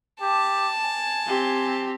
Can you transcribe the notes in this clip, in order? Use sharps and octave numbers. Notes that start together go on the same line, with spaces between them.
G4 A5
G#5
C4 G4